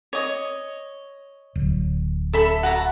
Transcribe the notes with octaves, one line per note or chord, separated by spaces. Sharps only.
C#5 D#5
D1
A4 E5 B5
F#4 A5 A#5